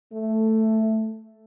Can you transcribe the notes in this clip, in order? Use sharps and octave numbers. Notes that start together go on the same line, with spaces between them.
A3